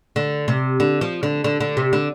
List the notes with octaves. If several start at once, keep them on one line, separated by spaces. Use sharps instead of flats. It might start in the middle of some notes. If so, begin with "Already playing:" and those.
D3
C3
D3
F3
D3
D3
D3
C3
D3